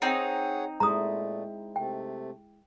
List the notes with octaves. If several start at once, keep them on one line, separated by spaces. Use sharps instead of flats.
C4 D#4 G#4 C#5 F#5
A#2 G#3 A3 E4 A#5 D#6
C3 A3 G5